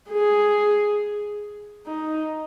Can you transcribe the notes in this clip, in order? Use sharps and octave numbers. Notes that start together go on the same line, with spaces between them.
G#4
D#4